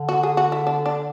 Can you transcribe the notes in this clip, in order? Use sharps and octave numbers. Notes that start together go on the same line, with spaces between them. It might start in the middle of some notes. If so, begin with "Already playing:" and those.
Already playing: D3
F#4
G#4
F#4
E4
D4
D4